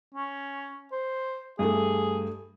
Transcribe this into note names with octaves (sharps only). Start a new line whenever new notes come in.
C#4
C5
G2 A3 G#4